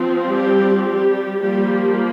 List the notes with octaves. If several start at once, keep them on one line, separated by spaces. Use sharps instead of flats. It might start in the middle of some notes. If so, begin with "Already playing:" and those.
Already playing: F3 C4
G3 G4
G3 G4
F3 G3 A#3 G4